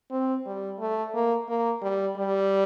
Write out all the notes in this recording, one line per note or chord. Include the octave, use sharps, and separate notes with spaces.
C4
G3
A3
A#3
A#3
G3
G3